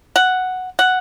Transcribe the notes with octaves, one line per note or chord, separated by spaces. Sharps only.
F#5
F#5